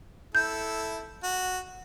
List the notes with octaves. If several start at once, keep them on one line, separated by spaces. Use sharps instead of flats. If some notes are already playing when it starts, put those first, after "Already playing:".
E4 A4 G6
F#4